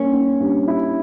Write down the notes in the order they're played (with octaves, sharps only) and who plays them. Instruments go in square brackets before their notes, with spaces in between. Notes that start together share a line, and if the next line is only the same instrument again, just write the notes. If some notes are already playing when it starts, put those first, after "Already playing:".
Already playing: [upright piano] G2 A#3 [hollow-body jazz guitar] C#4
[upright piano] A#3
G2
E4